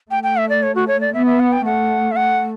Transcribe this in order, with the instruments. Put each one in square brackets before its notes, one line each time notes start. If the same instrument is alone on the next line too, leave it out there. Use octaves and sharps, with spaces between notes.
[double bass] A3 [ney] G5
[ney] G5
E5
D5
C#5
F#4
C#5
D5
[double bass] B3 [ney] E5
[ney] E5
F#5
G5
[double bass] A3 [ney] F#5
[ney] E5
[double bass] A3 [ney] F#5